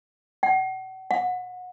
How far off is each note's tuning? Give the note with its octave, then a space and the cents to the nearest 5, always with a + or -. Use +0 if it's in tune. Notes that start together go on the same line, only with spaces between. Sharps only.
F#5 +40
F#5 -25